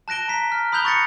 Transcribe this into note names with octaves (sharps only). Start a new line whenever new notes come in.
A5 F#6 A#6 D7 G7
A#5 B6
F6
B5 D#6 F#6 G6 F7 G7
C#6 D#6 A6 A#6 C#7